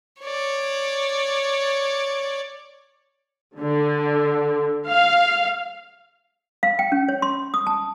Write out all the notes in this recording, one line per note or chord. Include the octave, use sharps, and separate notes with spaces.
C#5 D5
D3
F5
F5
G5
C#4
C#5
C6
D#6
A5